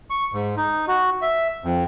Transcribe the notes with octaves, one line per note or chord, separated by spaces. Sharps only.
C#6
G#2
D#4
F#4
E5
F2